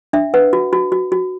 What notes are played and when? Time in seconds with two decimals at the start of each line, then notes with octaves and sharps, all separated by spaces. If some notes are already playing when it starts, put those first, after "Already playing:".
0.13 D4 E5
0.34 B4 F#5
0.53 F#4
0.73 F#4
0.92 F#4
1.12 F#4